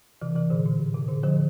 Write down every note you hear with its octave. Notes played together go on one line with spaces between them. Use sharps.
C3 E3
C3 E3
A#2 D3
A#2
A2
C3
A#2 D3
D3 F3